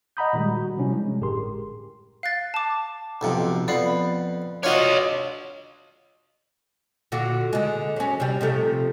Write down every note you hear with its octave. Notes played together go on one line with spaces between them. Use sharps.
D#5 F#5 A#5 B5 D#6 G6
A#2 D#3 G3 G#3
F#4
C3 F3 G3 C#4 D4 E4
G#3
G1 A2 G4 G#4 A#4 C6
F5 F#6 A6
A5 D6
B1 F2 C3
F2 B3 D5 F5 B5
D4 F4 F#4 C#5 D#5
A#2 D3 F#4
D3 G#3
F#3 C#4
C3 G3
C3 F3 A3